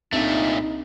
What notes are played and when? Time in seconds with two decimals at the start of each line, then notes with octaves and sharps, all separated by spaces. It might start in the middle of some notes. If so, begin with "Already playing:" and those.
0.13 C2 A#2 A3 D4 D#4 E5